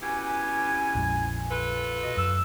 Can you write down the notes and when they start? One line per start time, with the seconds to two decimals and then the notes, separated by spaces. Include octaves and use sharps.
0.02 B2 C#4 E4 G4 G#5
0.95 A#1 F2 G#3
1.51 F4 A4 B4
2.03 B2 D#5
2.17 F#2 E6